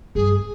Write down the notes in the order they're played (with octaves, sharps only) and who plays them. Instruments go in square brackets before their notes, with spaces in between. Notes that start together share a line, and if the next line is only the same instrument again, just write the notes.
[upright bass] G2 [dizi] G#4